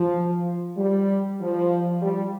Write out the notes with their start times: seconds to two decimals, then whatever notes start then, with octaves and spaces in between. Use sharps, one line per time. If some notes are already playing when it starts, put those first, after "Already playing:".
Already playing: F3
0.78 G3
1.41 F3
2.02 G3